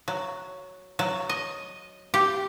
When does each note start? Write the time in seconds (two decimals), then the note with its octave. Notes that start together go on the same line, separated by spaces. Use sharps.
0.08 F#3
0.99 F#3
1.29 D#5
2.14 G4